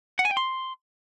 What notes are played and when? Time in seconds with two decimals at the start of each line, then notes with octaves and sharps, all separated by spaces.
0.19 F#5
0.25 G#5
0.31 G5
0.37 C6